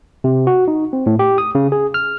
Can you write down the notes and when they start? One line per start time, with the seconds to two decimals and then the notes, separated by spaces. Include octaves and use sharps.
0.24 C3
0.47 F#4
0.68 D#4
0.93 C4
1.06 A2
1.19 G4
1.38 D#6
1.55 C#3
1.72 G#4
1.94 F6